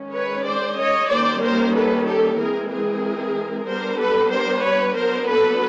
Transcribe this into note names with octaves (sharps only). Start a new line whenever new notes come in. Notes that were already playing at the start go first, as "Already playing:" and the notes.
Already playing: D#3 G#3 C#4
B4 C#5
C5 D5
C#5 D#5
D#3 G3 A#3 C#4 C5 D5
A#4 C5
A4 B4
G4 A4
E3 G#3 C4 G#4 A#4
G#4 A#4
G3 B3 D4 A#4 C5
A4 B4
A#4 C5
B4 C#5
F#3 B3 D4 A#4 C5
A4 B4